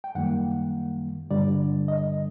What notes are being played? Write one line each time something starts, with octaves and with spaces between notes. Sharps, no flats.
G5
F#2 D#3 G3 A#3 F#5
G2 D3 G3 D5
D#5